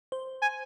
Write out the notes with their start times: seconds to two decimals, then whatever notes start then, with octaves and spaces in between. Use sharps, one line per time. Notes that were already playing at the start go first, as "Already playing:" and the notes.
0.12 C5
0.42 G#5